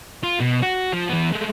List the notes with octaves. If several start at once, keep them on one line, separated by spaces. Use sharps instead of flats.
F4
B2
F#4
F3
E3 B3
G#3 A3